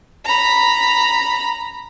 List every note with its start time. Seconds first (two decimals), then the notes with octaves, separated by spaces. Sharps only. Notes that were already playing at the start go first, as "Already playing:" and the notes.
0.25 A#5 B5